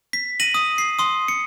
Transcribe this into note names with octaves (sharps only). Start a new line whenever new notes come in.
B6
A#6 D#7 F#7
D#6
C7
C6 D#6
C#7